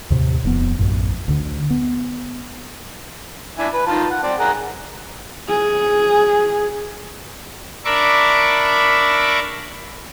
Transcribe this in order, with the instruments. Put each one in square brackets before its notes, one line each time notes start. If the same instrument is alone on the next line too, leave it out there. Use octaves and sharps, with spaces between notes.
[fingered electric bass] D#2 A2 C3
D#1 F2 A#3 B3
A#1 F#2 A2
D2 D3
B3
[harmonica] D4 E4 G#5
B4
D#3 F4 A5
F#5
C4 D5
G#4 A#4 F#5
[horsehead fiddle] G#4
[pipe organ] D4 A#4 E5 B5 C#6 D6